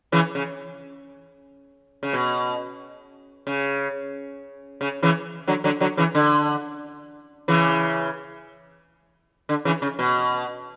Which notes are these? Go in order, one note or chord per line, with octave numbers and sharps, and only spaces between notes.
C#3 E3
C#3
C#3
B2
C#3
C#3
C#3 E3
D3 F#3
D3 F#3
D3 F#3
C#3 E3
D3
C#3 E3
D3
C#3 E3
C#3
B2